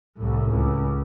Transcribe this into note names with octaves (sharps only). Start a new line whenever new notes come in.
C2 A2
C#2